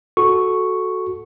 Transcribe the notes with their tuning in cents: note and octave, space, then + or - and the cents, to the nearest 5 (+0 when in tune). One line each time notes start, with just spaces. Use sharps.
F#4 +0 A4 -10 C#6 +0